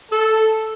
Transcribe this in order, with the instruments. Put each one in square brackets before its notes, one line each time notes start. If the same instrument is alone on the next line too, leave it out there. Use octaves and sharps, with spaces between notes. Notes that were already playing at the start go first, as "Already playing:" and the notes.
[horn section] A4